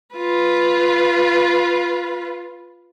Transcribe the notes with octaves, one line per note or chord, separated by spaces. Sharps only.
F4 B4